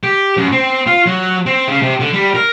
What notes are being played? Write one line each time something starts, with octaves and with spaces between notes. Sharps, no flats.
G4
F#2
C4
F4
F#3
C4
C#3
C3
D3
G3
A#4